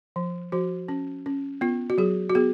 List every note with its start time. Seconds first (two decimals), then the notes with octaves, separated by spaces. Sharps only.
0.16 F3
0.52 F3 F#4
0.88 C#4
1.26 C#4
1.61 B3 F4
1.90 F#4
1.98 F#3 G#4
2.30 F#4
2.35 B3 G#4